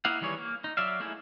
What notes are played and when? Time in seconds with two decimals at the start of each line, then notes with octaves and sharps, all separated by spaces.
0.05 A#3 E4 D#5 F5 F#5
0.21 D#3 E3 G3 G#4 C#5
0.38 A#3
0.64 D#4
0.77 F#3 D5 E5 F5
1.00 A3 A#3 D#4 E4 G#4